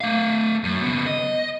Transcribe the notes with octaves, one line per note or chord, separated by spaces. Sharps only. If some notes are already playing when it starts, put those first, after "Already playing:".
A3 F5
F#2
C#3 B3
D#5